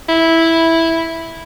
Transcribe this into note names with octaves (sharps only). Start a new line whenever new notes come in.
E4